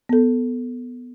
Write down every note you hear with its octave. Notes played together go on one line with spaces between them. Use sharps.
B3 A4